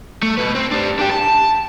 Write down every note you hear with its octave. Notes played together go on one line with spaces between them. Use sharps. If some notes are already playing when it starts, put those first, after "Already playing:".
A3
B2 B4
C4
G3 D4
D4 G4
A5